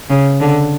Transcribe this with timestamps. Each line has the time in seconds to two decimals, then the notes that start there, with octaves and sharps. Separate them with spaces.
0.10 C#3
0.40 D3